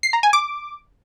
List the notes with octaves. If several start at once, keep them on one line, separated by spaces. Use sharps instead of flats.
C7
A#5
G#5
D6